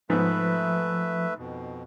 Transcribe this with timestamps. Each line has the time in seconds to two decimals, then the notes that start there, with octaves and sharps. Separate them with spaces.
0.10 G#2 F3 A3 B3 B4 E5
1.38 F2 B2